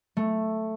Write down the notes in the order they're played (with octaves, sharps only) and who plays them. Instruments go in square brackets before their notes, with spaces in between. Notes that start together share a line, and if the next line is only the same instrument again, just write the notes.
[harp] A3